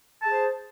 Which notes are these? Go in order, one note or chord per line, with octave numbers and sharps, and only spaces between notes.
G#4 C5 A5